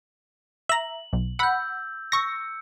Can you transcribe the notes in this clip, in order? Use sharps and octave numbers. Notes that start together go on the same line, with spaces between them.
E5 A#5 F#7
B1
F#5 B5 E6 G6
C#6 E6 A#6 C#7